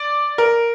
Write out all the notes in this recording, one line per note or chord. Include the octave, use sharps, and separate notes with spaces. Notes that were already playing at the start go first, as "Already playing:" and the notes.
Already playing: D5
A#4